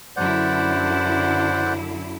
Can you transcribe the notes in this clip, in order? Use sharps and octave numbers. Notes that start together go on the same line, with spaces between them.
F#2 D3 E4 C5 D5 F#5